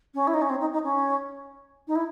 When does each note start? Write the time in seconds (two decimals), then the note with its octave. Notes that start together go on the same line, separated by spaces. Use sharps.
0.14 C#4
0.27 E4
0.33 D#4
0.41 C#4
0.49 C4
0.60 D#4
0.72 D#4
0.83 C#4
1.87 D#4
1.95 E4